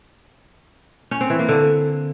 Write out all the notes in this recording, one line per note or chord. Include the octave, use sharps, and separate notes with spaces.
C#4
C4
E3
A#3
D3